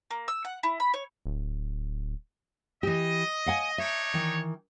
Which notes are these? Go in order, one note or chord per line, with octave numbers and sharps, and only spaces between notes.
A#3
E6
F#5
E4
B5
C#5
D1
E3 G4 D#5
F5 F#5 G#5
D4 D#4 C#5 E5
D#3 E3